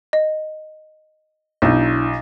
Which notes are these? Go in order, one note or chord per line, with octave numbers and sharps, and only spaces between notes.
D#5
B1 D4 E4 G6